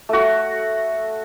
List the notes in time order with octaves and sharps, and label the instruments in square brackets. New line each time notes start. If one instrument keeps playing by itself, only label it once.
[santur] A3 F#4